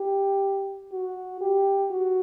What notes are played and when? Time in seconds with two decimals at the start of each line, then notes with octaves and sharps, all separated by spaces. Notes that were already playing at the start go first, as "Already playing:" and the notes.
Already playing: G4
0.93 F#4
1.41 G4
1.90 F#4